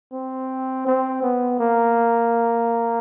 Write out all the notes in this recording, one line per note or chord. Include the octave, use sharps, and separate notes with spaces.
C4
C4
B3
A#3